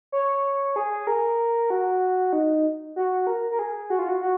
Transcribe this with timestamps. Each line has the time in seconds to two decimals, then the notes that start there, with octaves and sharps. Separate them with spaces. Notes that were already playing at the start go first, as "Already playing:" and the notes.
0.12 C#5
0.76 G#4
1.07 A#4
1.70 F#4
2.33 D#4
2.96 F#4
3.27 A#4
3.51 A#4
3.59 G#4
3.90 F#4
3.99 F4
4.08 F#4
4.22 F#4